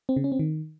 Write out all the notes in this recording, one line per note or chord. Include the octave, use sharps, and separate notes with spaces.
C4
C#3
C#4
C4
D#3